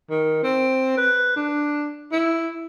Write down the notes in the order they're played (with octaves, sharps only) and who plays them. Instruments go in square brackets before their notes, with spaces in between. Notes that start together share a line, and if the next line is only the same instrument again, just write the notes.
[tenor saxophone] D#3
C4
B4
D4
E4